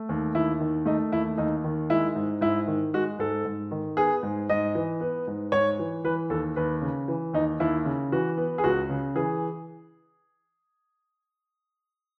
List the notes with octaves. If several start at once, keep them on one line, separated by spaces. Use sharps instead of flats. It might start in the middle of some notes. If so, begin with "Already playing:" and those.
Already playing: A3
D#2
D#2 E4
D#3
A3 D#4
D#2 E4
D#2 D#4
D#3
G#3 E4
G#2
G#2 E4
D#3
G#3 F#4
G#2 A4
G#2
D#3
B3 G#4
G#2
G#2 D#5
E3
B3
G#2
G#2 C#5
E3
E3 B4
D#2 A4
D#2 B4
C#3
E3
D#2 D#4
D#2 E4
C#3
E3 F#4
B3
G#4
C#2 F#4
C#3
E3 G#4